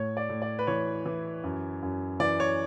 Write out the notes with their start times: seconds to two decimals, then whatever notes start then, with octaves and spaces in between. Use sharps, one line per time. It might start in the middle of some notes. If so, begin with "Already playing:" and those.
Already playing: A2 C#5
0.17 D5
0.29 A2
0.42 D5
0.59 B4
0.67 E3 C#5
1.06 E3
1.43 F#2
1.82 F#2
2.20 E3 D5
2.40 C#5